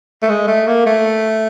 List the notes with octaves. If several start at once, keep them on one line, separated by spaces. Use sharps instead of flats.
A3
G#3
A3
A#3
A3